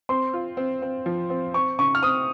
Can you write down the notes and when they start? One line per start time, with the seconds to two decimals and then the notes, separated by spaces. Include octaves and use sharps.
0.09 C4 C6
0.34 F4
0.57 C4
0.82 C4
1.06 F3
1.30 C4
1.54 C4 C#6
1.79 C#3 C#6
1.95 F6
2.02 C4 D#6